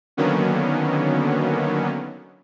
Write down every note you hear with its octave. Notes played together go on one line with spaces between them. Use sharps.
D3 D#3 F#3 A#3 B3 C#4